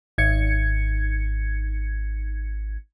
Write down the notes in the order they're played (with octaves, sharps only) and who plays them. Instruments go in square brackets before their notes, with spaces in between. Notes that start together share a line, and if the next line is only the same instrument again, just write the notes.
[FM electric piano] G#1 G#6 C#7